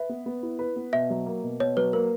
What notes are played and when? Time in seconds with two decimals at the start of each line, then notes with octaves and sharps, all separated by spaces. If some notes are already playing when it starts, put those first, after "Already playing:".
Already playing: B4 E5
0.09 B3
0.26 B3
0.43 E4
0.59 B4
0.76 B3
0.93 B2 E5
1.10 F#3
1.26 A#3
1.44 B2
1.60 B2 C#5
1.77 F#3 B4
1.93 A#3 A#4